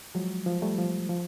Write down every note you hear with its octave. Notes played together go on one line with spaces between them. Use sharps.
F3 F#3 G#3
F3
G3 A3
F3
F3